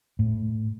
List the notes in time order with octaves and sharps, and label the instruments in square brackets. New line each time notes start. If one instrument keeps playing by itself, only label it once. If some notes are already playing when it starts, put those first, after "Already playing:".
[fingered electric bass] A2